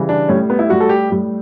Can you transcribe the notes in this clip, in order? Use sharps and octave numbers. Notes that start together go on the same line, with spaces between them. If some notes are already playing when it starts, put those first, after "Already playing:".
Already playing: C#3 E3 G3
D4
A2 G3 C#4
B3
E4
A2 G3 F#4
A4
G4
A2 G3